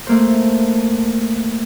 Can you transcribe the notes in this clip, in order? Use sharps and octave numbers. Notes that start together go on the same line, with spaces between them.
A3 A#3 C5